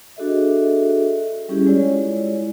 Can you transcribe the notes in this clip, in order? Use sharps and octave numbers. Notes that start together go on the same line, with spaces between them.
D4 F#4 G#4 A4 D#5 E5
G3 C#4 E4 G4 G#4
G#3 E4 F4 C#5 D5